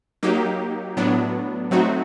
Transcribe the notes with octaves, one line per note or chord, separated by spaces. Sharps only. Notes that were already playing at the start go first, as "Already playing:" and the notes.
F#3 A#3 D#4 G4
A2 F#3 B3 D4
F#3 A3 C4 D#4 F#4